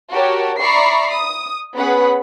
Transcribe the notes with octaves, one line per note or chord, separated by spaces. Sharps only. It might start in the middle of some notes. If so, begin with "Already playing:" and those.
F#4 G4 A#4 C#5 A5
D5 E5 A#5 B5 C#6 C7
D#6
B3 C#4 G#4 B4 F#5 B5